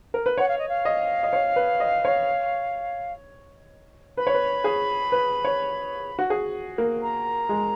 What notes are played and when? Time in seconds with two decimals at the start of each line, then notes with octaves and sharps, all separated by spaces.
0.14 A#4
0.26 B4
0.38 C#5 F#5
0.48 F5
0.58 D#5
0.69 F5
0.85 D#5
1.23 D#5
1.33 C#5
1.56 B4
1.80 D#5
2.05 C#5
4.17 B4 B5
4.27 C#5
4.34 B4
4.64 G#4
5.12 B4
5.45 C#5
6.19 F#4
6.30 G#4
6.78 A#3
7.02 A#5
7.49 G#3